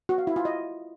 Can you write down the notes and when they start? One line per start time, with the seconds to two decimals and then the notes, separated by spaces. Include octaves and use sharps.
0.09 F#4
0.18 F5
0.27 E4
0.36 F4
0.45 D#5